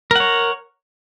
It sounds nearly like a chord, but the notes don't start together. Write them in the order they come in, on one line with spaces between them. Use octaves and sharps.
A#4 F#5 C#5